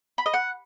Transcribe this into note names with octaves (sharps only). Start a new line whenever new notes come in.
B5
D#5
F#5